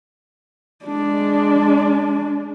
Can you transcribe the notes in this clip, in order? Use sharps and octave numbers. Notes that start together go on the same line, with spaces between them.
G#3 D4